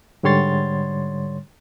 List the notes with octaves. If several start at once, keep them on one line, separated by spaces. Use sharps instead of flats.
G#2 D3 G3 C#5 C6 A6